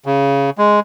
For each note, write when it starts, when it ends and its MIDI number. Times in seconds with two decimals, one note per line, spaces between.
0.06 0.50 49
0.58 0.80 56